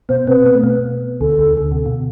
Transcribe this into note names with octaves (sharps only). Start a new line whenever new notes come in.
B2 B3 C5
C3 C4 B4
B3
A3
B2 B3
D2 D3 A4
D2 D3
D3
C3
B2